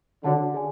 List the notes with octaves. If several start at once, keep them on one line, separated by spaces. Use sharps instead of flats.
D3 F#4 C#5 F#5 A5
G#4 D5 G#5